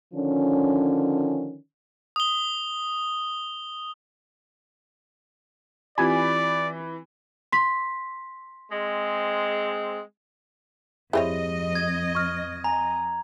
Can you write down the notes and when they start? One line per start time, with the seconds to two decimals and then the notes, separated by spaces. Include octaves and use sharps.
0.14 D3 D#3 F3 C#4
2.16 D#6 G7
5.98 E3 C4 F4 G4 D5 G#5 B5
7.52 C6 B6
8.71 G#3 C4
11.13 F2 E4 G4 G#4 C5 C#5 D#5
11.75 G#6
12.15 C#6 F6
12.64 G#5 A#5